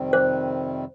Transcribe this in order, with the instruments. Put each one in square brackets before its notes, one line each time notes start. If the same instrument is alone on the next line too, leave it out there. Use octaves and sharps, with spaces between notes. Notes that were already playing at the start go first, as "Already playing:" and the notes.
Already playing: [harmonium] F2 C3 D#3 G3 C4
[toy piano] C5